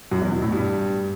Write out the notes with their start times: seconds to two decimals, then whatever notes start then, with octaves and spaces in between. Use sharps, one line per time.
0.11 F#2
0.22 E2
0.32 B2
0.42 A2
0.52 G2